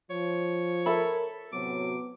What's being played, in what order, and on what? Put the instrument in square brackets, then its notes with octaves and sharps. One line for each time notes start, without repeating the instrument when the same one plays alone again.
[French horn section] F3 [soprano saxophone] C#5
[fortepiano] A4 E5 B5 [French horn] A#4
[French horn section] A2 C3 F#3 [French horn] B3 [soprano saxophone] D6